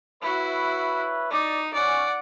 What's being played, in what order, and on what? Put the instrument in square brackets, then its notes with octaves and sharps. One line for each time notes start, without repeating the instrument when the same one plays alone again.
[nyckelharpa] E4 F#4 [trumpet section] B4 C#5 E5
[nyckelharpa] D#4 [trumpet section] D5
[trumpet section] C#4 [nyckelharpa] D5 F#5